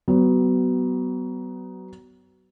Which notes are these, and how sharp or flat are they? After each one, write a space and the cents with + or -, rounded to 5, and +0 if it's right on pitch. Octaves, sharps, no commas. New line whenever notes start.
F#3 +30 B3 +15